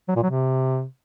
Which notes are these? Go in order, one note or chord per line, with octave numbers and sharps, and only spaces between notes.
F#3
A#2
F#3
C3